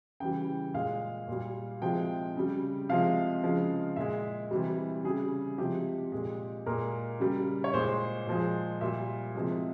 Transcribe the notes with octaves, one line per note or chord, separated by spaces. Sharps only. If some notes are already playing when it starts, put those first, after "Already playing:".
C#3 E3 G3 G5
A#2 G#3 F5
A#2 G3
C3 F3 G#3 G5
C#3 G3
C3 F3 G#3 F5
C#3 F3 G#3
A#2 G#3 E5
C3 E3 G3
C#3 G3 G#4
C3 F3 G#3 G4
A#2 G#3
A#2 G#3 A#4
C#3 G3
C#5
A#2 G#3 C5
A#2 F3 G#3
A#2 G3 E5
C3 F3 G#3